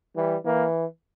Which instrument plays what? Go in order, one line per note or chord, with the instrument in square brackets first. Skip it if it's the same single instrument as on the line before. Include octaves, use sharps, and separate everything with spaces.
[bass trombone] E3 [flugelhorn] G3
[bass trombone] E3 [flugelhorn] A#3